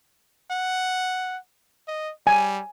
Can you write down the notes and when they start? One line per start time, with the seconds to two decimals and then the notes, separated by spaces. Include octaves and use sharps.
0.52 F#5
1.88 D#5
2.27 G3 G#5